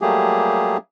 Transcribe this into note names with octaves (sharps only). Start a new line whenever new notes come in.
F#3 G3 A3 A#3 G4 G#4